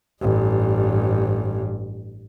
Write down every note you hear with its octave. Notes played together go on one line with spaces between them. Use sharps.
A1 G2